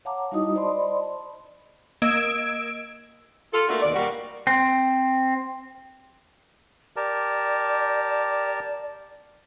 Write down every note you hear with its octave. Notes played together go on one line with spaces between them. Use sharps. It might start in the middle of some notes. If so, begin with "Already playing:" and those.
C#5 F5 F#5 A5 A#5 D6
G3 D#4 E4 F#4 D#5 D#6
C5 D5 D#5 A5 B5 C6
A#3 D#5 E6 G#6 D7
F4 A4
A3 A#3 D4 F#4
D#2 B2 D5
G3 A#3 F#4
C4
G4 A#4 D5 A5